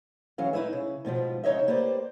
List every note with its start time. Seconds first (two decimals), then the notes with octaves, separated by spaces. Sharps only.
0.38 E3 F#3 C#4 F5
0.53 D#4 E4 B4 C#5 E5
0.73 C#3
1.05 G#2 B2 D3 F3
1.44 C#3 D#4 C#5 D#5 E5
1.68 A#3 G4 B4 C5 D5